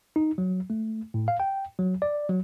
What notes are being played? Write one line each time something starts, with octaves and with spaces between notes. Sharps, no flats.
D#4
F#3
A3
A2
F5
G5
F#3
D5
F#3